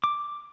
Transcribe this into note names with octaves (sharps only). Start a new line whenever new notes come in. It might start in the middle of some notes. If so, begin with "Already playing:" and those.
D6